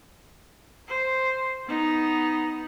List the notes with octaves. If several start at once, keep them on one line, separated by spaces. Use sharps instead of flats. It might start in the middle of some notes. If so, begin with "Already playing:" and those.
C5
B3 D#4